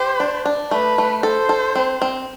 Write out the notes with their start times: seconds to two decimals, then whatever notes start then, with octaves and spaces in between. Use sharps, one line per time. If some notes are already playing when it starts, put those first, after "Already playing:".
Already playing: G4 C5
0.20 D4
0.45 D4
0.71 A3 B4
0.98 A3
1.23 A4 C5
1.49 A4
1.75 C4
2.02 C4